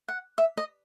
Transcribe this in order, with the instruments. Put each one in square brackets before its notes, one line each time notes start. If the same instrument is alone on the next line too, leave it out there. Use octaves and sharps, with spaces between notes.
[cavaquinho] F#5
E5
D#5